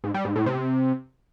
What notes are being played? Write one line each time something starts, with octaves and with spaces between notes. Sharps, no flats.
G#2
G3
G#2
A2
C3